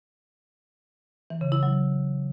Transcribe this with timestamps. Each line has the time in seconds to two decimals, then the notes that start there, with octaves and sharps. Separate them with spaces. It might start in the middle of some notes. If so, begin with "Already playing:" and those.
1.30 E3
1.41 C#3
1.52 E4
1.63 F#3